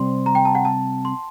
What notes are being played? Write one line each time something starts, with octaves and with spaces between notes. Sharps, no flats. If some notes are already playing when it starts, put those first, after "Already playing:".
Already playing: C3 G3 C4 C6
A#5
G5
A5
F#5
A5
C6